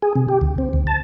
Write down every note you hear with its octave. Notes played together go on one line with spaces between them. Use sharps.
G#4
C3
G4
D2
C4
D2
A5